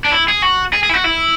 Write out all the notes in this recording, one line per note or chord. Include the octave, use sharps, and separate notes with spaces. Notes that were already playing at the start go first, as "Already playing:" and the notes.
D4
E4
G#4
F#4
G#4
G#4
E4
F#4
E4